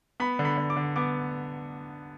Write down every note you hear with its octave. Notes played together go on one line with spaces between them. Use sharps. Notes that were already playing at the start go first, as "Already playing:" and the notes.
B3 B5
D3
B5
D3
D6
D3
B3 D6